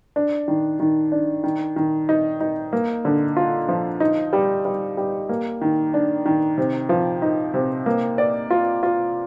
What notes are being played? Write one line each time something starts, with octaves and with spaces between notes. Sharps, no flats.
D4
D#3
D#3
D4
D#3
D#3
D#4
D#4
A#3
D3
F4
F3
D#4
G3
G3
G3
A#3
D#3
D4
D#3
C3
F3
D#4
C3
A#3
D5
F4
F4